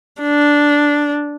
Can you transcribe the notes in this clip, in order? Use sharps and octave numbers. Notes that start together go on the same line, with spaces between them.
D4